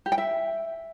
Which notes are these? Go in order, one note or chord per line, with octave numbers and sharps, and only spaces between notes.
G4
G5
E5